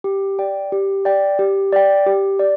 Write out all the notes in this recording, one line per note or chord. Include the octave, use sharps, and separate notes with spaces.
G4
D5 G5
G4
D5 G5
G4
D5 G5
G4
D5